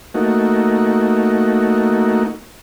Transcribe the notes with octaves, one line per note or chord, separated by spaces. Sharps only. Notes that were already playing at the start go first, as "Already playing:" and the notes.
A3 A#3 D#4 F#4